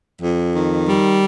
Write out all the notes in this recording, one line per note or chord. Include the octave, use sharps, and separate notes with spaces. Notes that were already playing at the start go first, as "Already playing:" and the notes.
F2
D#3
G3